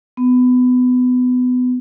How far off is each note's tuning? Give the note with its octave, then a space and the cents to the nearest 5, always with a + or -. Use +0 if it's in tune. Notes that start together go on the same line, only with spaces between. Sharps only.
B3 +25